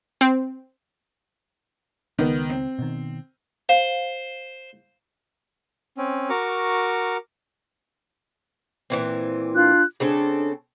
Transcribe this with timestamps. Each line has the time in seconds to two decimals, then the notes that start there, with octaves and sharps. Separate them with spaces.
0.21 C4
2.19 C#2 D#3 B3
2.50 C4
2.79 B2 D#3
3.69 C5 F5
5.98 C4 C#4
6.30 F#4 A#4 A#5 C#6 D6
8.90 A#2 E3 C4
9.54 D4 F4 F#6
10.00 C#3 C4 D4 A4